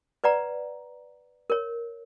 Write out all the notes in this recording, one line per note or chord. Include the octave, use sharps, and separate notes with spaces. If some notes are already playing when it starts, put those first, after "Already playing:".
B4 D5 F#5 A#5
A#4 C#5